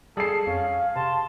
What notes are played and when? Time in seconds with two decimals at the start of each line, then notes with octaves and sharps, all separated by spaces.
0.17 G3 G#4 A4 C7
0.47 F2 C#4 F5
0.96 C3 A5 C6